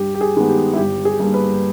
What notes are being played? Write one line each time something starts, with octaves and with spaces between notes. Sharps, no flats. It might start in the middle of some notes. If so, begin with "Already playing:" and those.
Already playing: G2 G4
G4
G#4
D#3 G#3 B3
G4
E4
G1 G4
G#4
G2 G3 A#3
B4